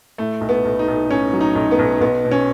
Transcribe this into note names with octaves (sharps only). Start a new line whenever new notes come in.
A2 A3
B1
B3
B1
D#4
B1
A2 C#4
F#3
D#4
B1
B3
B1
B1 B3
B2
C#4